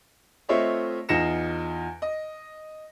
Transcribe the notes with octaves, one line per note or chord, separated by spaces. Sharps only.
A3 C4 F4 C#5 D#5 E5
E2 D#4 F4 A#6 C#7 E7
D#5